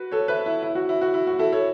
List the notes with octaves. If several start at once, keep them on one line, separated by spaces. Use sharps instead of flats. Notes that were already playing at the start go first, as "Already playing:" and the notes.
Already playing: F#4 B4
A4 C#5
B4 E5
E4
E4
F#4
E4
F#4
E4
F#4
E4 A4
A4 C#5